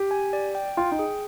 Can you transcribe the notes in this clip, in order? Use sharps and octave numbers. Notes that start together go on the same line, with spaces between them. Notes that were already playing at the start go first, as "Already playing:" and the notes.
Already playing: G4
G#5
D5
G5
F4 G5
D#4
G#4